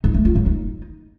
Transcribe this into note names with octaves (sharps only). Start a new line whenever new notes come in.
D#4
A3
F4
F#3
D#4